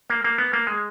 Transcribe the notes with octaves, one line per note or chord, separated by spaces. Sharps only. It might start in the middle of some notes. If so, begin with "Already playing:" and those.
A#3
A#3
B3
A#3
G#3